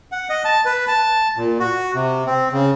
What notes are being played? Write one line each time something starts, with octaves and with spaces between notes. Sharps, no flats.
F#5
D#5
A5
B4
A5
A#2
F#4
C3
C4
C#3